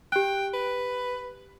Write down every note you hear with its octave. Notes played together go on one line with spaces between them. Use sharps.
G4 G5 F#6
B4